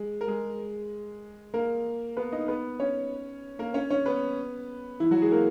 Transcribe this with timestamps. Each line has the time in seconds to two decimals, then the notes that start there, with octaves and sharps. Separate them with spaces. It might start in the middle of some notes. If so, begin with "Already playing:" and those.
Already playing: G#3 G#4
0.21 A#4
0.28 G#3 G#4
1.54 A#3 A#4
2.17 B3 B4
2.32 D#4 D#5
2.48 B3 B4
2.80 C#4 C#5
3.59 A#3 A#4
3.74 C#4 C#5
3.90 C#4 C#5
4.06 B3 B4
5.00 E3 E4
5.11 F#3 F#4
5.21 G#3 G#4
5.32 A#3 A#4